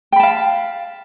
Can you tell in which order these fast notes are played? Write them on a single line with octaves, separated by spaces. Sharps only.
G5 B5 A5 F5